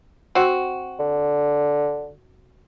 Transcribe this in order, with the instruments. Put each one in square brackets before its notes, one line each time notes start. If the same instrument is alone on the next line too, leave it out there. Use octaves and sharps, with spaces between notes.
[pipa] C4 F#4
[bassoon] D3